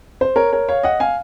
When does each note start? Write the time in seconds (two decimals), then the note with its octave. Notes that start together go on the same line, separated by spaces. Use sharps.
0.21 C5
0.36 A#4 C#5
0.52 A#4 C#5
0.69 C#5 F5
0.83 D#5 F#5
1.00 F5 G#5